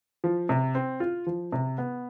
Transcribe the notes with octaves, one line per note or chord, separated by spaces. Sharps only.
F3
C3
C4
F4
F3
C3
B3